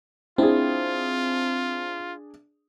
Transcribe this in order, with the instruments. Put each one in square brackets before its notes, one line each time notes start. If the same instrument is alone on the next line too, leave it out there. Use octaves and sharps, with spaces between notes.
[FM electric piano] C4 [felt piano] D4 G#4 [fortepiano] E4 [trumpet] F4